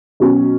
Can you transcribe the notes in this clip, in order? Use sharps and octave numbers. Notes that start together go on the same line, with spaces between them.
B2 F#3 C#4 F#4